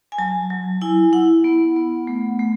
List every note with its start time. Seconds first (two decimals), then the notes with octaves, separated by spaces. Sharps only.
0.12 G#5
0.18 F#3 A5
0.50 F#3
0.81 E4 G#5
1.13 E4 F#5
1.44 B3
1.76 B3
2.07 A3
2.39 A3